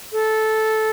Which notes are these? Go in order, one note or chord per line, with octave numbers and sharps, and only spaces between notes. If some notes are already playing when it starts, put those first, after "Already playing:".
A4